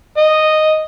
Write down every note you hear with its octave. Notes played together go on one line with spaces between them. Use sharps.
D#5